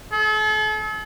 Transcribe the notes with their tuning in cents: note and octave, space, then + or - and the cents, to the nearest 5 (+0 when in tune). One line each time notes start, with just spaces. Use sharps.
A4 -40